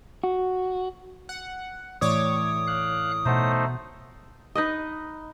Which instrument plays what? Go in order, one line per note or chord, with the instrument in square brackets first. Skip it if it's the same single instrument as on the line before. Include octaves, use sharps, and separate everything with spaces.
[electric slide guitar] F#4
[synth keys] F#5
[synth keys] A2 C#5 D6 [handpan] E3 D5 [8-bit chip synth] D#6
[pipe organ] F5 F#6
[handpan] B2 F#5 [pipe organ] A3 D#4 C5
[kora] D#4 B4 D#5